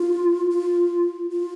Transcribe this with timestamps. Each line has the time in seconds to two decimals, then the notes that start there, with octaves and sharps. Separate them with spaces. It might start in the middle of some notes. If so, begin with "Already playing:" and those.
Already playing: F4
0.50 F4
1.30 F4